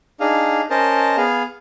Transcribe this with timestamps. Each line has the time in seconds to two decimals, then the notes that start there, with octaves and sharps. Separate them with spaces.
0.20 D4 D#4 G#4 F5
0.70 C#4 A#4 C5 D#5 A5
1.17 B3 G#4 F5